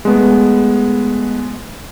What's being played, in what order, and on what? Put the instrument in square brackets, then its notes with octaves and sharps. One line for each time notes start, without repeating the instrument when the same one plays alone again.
[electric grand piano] G#3 A3 B3